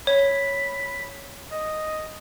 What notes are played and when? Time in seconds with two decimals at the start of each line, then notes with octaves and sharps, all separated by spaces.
0.07 C#5 B5
1.51 D#5